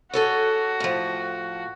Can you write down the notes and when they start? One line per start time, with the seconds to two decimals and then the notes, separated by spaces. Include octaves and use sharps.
0.13 F#4 G#4 A4 C#5
0.80 A2 F3